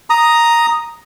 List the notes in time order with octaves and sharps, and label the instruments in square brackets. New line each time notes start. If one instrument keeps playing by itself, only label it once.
[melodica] A#5 D#6